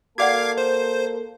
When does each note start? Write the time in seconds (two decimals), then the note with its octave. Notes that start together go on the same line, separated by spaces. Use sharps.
0.18 A#3 F#4 A4 D5 F5 F#5 D6 G#6
0.57 C5